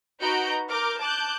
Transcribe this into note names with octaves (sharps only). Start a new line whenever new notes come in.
D#4 F#4 B4 A#5 G6 D7
A#4 D6 F6 G6
A5 D6 F#6 G6